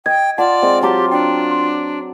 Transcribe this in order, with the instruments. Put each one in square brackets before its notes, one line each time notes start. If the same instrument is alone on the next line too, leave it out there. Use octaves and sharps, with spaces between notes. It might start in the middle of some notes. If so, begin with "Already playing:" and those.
[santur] D#5 [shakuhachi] G5 [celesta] G#6
[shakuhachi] F4 [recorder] D5 [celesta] F#5 [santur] A5
[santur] G#3 C4
[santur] F#3 A5 D6 [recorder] G4
[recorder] D4 [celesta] G5
[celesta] C6